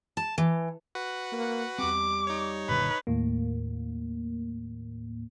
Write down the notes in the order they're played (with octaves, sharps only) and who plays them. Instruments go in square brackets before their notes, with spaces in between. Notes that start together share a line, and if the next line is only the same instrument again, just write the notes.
[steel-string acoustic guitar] A5
E3
[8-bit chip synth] F#4 B4 F#5
[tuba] A#3
[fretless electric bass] E2 C4 [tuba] G3 [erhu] D6
[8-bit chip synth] D#4 C#5
[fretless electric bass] F#1 A#2 D3 [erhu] B4
[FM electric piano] D#2 A2 A#3